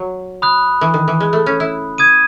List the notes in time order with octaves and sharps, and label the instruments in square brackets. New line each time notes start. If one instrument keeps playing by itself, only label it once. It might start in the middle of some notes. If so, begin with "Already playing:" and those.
Already playing: [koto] F#3
[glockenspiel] B5 D#6 F#6
[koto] E3
D#3
E3
G#3
A3
C#4
E4
[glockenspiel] D#6 G#6 D#7